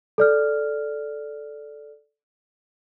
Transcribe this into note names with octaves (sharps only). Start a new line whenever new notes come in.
A4 D5 F6